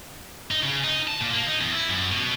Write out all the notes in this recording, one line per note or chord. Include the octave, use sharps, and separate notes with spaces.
D#4
C#3
D#4
A5
A#2
A#3
D#4
E2
E4
F#2
B2